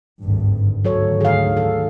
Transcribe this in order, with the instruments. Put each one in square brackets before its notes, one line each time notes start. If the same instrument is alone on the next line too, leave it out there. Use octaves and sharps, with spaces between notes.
[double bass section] G#1 D2 G2
[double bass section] D2 G#2 D#3 [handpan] F#3 A4 C#5
[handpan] G#4 F5
A4